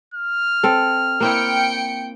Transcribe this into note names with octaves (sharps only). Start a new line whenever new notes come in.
F6
C4 A4
A#3 C4 E4 G5 C#7